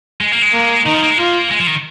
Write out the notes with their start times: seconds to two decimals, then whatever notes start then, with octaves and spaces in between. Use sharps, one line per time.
0.21 G#3
0.32 A#3
0.42 G#3
0.53 A#3
0.86 D#3 D#4
0.94 F3
1.03 A#3
1.11 G#3
1.18 A#3 F4
1.51 G#3
1.59 F3
1.67 D#3